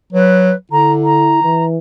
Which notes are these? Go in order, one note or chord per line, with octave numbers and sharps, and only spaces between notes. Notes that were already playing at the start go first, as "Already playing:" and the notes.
F#3 B4
D3 E4 A#5
A#5
E3